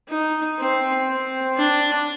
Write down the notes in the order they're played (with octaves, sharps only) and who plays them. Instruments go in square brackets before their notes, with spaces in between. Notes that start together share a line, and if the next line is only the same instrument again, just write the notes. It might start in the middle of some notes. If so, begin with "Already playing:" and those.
[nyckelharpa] D#4
C4
C4
D4